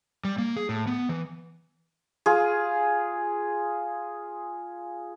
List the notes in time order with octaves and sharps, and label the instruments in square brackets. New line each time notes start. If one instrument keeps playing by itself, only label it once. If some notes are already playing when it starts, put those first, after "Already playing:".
[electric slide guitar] G3
A#3
G#4
A2
B3
E3
[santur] F4 G#4